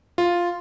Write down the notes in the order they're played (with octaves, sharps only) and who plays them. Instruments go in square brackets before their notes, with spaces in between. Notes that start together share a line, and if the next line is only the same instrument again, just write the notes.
[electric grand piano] F4